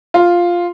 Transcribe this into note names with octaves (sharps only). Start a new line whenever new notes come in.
F4